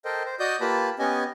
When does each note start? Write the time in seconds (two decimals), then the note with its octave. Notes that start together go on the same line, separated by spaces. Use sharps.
0.05 A4 A#4 C5 D#5 G5
0.26 C5
0.40 F#4 D5 D#5 D#6 G6
0.61 A#3 F4 G4 B4 A5 B5
0.99 B3 C#4 G4 D#5 G#5